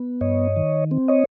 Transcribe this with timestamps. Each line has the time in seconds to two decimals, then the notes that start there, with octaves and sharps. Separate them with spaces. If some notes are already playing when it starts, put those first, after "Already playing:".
Already playing: B3
0.21 G2 C#5 D#5
0.56 D#3
0.91 C4
1.08 C#5 D#5